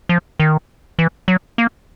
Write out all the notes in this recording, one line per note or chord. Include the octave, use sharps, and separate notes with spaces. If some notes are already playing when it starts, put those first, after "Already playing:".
F3
D#3
E3
F#3
A#3